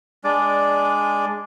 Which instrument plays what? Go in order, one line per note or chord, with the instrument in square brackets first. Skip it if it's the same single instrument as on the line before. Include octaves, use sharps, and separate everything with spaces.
[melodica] G#3 D4 D5